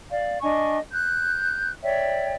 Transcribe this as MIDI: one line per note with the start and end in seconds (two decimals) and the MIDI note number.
0.10 0.38 74
0.10 0.38 77
0.42 0.78 62
0.42 0.78 75
0.42 0.78 80
0.42 0.78 85
0.92 1.72 90
0.92 1.72 91
1.83 2.35 73
1.83 2.35 74
1.83 2.35 76
1.83 2.35 79